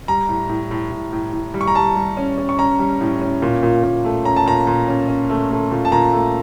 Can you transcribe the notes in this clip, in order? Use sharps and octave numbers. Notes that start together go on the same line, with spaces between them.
G3 A#5
A2
A2
A2
A2
A2
A2
G3
C#6
A#5
G3 A5
G3
C#4
C#4
C#6
C#4 A#5
G3
A2
C#4
A#2
A#2
A#2
A3
C#4 A#5
A5
A#2 A#5
A#2
C#4
C#4
A3
A3
A#2
A5
A#2 A#5
A3